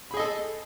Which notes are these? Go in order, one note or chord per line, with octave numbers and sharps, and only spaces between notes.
G#4 A4 D#5 B5